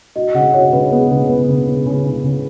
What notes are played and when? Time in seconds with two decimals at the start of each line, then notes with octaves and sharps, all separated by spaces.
0.16 F#4 D#5
0.34 C#3 F#5
0.54 F#4 C#5
0.73 C#3 B4
0.91 B3 G#4
1.10 C#3 B4
1.29 B3 B4
1.48 C#3
1.67 C#3
1.86 C#3
2.04 C#3
2.24 C#3